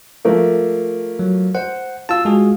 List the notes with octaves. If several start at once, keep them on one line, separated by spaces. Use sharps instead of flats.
F3 A3 A#3
F#3
C5 F#5
F4 A5 E6
G#3 F#4 G#4